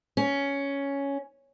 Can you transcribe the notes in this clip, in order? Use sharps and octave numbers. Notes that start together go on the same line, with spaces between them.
C#4